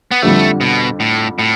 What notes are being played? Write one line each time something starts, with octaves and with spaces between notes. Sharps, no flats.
B3
F2 D3 G3 A3
B2
A2
A2